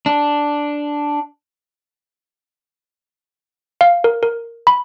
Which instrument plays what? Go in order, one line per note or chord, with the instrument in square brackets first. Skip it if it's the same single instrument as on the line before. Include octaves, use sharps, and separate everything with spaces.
[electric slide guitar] D4
[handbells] F5
A#4
A#4
B5